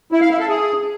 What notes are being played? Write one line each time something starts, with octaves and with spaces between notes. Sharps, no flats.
E4
F5
E4
A4
G#4